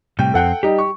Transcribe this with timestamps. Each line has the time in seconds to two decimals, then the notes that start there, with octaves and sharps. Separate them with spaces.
0.19 A2 C3 G3 G5
0.34 F2 C4 A4 F#5 G5
0.63 G3 D#4 G4
0.78 C#6